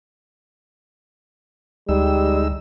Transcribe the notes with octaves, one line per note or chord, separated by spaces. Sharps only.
D2 G3 G#3 D#4 E6